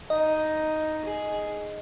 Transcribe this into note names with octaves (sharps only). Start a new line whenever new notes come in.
D#4 D#5
G#4